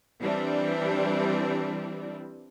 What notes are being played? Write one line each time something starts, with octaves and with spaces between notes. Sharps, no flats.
E3 G3 C4 D4